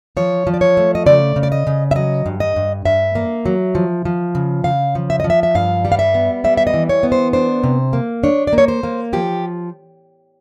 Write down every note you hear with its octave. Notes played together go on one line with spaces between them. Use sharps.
F3 C#5
F3
D5
C#5
A3
D#5
C#3 D5
C#3
D5
D#5
C#3
E5
F#3 D#5
G2
D#5
G2
G2 E5
A#3
F#3
F3
F3
C#3
C#3 F5
F3
E5
F3 D#5
E5
E5
G2 F5
G3
F5
E5
B3
G3 E5
E5
D#5
E3
C#5
B3
C5
D4 C5
C3
A#3
D4 C#5
D5
A#3
C#5
C5
A#3
F3 G4